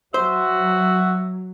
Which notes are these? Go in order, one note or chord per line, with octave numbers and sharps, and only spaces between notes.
F#3 F#4 C5 E5